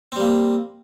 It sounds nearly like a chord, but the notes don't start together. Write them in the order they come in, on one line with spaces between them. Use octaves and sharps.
C4 G3 A#3